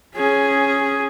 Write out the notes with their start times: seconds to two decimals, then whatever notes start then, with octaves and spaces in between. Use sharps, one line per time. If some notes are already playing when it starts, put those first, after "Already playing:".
0.15 C#4 G#4